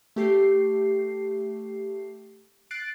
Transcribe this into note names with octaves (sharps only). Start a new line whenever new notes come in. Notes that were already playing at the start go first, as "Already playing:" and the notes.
A3 G4 C7
F#6 A6 C7 D7